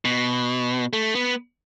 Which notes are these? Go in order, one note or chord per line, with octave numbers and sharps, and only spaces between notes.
B2
A3
B3